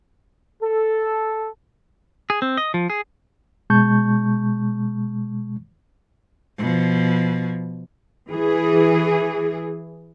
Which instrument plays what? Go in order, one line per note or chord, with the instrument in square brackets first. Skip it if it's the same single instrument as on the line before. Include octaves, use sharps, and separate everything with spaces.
[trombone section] A4
[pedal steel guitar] G#4
C4
D#5
F3
G#4
[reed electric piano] B2 G#3 A5 C#6 G6
[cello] B2 F3
[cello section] E3 G#4